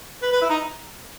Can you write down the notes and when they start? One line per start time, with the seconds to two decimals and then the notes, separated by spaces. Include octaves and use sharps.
0.22 B4
0.32 B4
0.42 E4
0.50 D#4